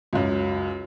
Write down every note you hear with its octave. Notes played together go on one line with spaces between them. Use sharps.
C#2 F#2